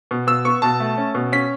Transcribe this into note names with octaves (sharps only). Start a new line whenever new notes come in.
B2
B2 E6
B3 C#6
B2 A5
A3
C#4
B2
C#4 B6